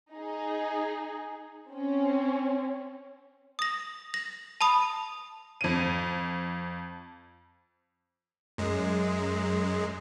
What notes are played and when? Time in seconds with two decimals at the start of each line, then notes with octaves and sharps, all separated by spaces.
0.12 D#4 G#4
1.71 C4 C#4
3.59 D#6 A#6
4.14 A#6
4.61 A5 B5 D#6
5.61 F2 D#7
8.58 F#2 G#3